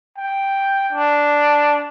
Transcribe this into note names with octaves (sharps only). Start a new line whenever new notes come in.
G5
D4